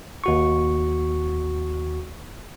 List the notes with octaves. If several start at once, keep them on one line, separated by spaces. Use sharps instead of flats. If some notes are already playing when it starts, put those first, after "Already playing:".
D#2 F#4 C#6